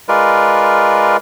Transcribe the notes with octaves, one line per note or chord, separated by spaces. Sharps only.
G#3 F4 A#4 B4 D5